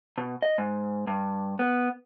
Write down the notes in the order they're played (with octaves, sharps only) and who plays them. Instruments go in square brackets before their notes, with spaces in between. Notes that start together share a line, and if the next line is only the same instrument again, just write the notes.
[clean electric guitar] B2
D#5
G#2
G2
B3